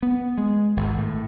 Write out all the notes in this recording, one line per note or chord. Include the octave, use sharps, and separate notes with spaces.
B3
G#3
G#1
A2